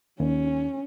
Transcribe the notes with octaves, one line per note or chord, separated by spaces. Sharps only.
D#2 C#4